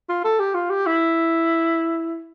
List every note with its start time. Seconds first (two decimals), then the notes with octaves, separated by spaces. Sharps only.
0.09 F4
0.24 A4
0.39 G4
0.55 F4
0.70 G4
0.86 E4